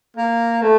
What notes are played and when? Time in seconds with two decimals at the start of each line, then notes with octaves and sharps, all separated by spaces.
0.17 A#3
0.62 A3